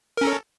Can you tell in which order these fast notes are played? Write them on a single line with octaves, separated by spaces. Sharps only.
A#4 C#4 A4